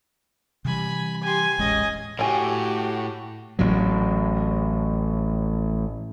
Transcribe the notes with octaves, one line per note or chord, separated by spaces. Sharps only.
C3 E3 G3 G#5 B5
G4 G#5 C6
D#1 A1 G#3 C#4 D#5
A2 A3 F#4 G4 G#5
A1 A2 F#3